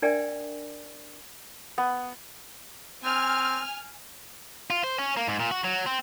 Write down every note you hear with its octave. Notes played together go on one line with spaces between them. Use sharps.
D4 A#4 D5 E5 G5 G#5
B3
C4 G#5 F6
F4
C5
C#4
A#3
G#2
A#2
F#4
F#3
C4